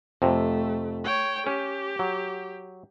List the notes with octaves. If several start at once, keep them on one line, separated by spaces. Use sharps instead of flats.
F2 C3 A3
C#5 G5
C#4 G4
F#3